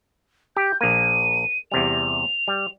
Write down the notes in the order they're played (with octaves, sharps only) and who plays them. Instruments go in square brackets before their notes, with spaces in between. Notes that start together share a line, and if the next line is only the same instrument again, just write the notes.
[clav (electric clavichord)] G4 [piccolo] G6
[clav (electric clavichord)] A#1 A#3 [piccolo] D#7
[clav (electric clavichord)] E2 C3 G3 [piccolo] F7
[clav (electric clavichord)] G3